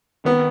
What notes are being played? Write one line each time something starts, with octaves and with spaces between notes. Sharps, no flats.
D#3 B3